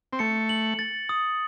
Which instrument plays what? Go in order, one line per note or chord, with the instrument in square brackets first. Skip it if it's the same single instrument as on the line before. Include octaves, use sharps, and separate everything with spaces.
[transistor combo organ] C4
[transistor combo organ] A3 [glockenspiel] C#7
[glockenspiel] F#7
A6
D#6